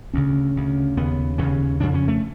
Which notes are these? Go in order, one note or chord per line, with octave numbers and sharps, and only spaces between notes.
D2 C#3 C#4
D2 C#3
D#2 C#3 B3
D#2 C#3 C#4
F2 C#3 D4
C#4
A3